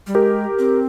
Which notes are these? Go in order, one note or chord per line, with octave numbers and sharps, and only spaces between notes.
G3
G#3 G4 A#4
C4